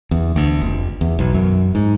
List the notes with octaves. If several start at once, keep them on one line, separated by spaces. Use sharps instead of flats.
E2
D2
F1
E2
B1
F#2
G#2